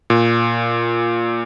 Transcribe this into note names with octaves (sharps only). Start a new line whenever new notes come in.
A#2